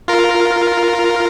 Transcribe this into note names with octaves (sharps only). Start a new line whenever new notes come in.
F4 A#4